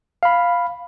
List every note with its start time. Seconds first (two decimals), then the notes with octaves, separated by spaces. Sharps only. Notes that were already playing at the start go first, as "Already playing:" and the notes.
0.23 F5 B5